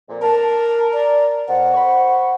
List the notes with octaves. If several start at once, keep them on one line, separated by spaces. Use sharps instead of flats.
F2 A#2
A#4 A5
D5
F2 F#5
C5 B5 C#6